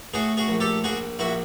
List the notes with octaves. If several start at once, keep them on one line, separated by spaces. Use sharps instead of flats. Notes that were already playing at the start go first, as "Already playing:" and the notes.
A2 F#4 G#4
F#4 G#4
A#1
G4 A4
A#1 F#4 G#4
A#1 E4 F#4